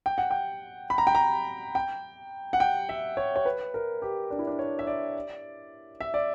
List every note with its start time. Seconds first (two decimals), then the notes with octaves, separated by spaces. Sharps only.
0.06 G5
0.18 F#5
0.31 G5
0.90 B5
0.98 A#5
1.07 G5
1.15 A#5
1.75 G5
2.53 F#5
2.60 G5
2.89 E5
3.17 C#5
3.36 C#5
3.45 B4
3.74 A#4
4.02 G4
4.31 D4
4.39 E4
4.47 D4
4.59 C#5
4.79 E5
4.87 D5
6.00 E5
6.14 D5